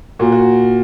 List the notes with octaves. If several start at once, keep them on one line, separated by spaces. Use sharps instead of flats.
A#2 F#4
F#4